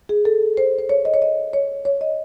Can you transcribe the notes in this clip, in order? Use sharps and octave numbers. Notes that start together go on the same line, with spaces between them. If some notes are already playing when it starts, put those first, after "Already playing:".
G#4
A4
C5
C5
C#5
D#5
C#5
D#5
C#5
C#5
D#5